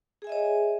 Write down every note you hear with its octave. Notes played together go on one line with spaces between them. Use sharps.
G#4 C#5 D#5 E5 G#5